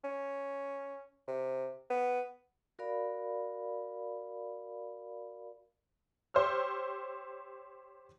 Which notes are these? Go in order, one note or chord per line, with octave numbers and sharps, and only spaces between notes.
C#4
C3
B3
F#4 A#4 D5 F5 B5
G4 C5 C#5 E6 F6